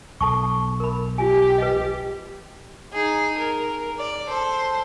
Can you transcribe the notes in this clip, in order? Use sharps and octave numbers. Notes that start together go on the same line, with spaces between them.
B1 A4 A5 C#6
A#4 B5
F4 G4 G#5
B4 D#5
D#4 G#4
A#4
D5
A4 C5